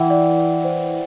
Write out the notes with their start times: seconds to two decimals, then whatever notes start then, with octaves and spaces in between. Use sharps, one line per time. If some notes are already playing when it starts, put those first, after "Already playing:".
Already playing: E3 E5 F#5 G5
0.10 D5
0.37 D5
0.64 C5